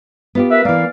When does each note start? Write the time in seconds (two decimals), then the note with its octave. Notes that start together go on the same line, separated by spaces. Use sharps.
0.35 B3 F4 G4
0.50 A#4 B4 E5
0.65 E3 A#3 D5 F5